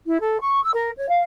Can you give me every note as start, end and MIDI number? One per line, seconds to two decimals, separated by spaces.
0.06 0.20 64
0.20 0.39 69
0.41 0.62 85
0.62 0.69 88
0.74 0.90 70
0.97 1.08 73
1.09 1.21 77